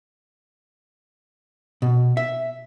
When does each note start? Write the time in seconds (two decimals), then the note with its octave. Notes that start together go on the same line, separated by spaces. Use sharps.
1.82 B2
2.17 E5